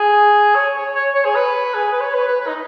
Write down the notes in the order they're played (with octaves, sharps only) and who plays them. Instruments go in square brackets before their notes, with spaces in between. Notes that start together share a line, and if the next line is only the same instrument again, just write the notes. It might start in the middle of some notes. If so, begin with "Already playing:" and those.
Already playing: [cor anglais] G#4
C#5
C#5
C#5
C#5
G#4
B4
G#4
B4
C#5
B4
B4
B4
D#4